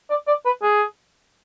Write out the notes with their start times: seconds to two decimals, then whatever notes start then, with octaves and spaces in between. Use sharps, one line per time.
0.10 D5
0.28 D5
0.45 B4
0.62 G#4